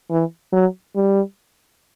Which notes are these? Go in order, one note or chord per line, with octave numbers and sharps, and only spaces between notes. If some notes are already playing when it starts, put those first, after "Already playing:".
E3
F#3
G3